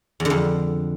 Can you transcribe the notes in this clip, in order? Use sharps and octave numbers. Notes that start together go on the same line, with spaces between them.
E2
D3
F2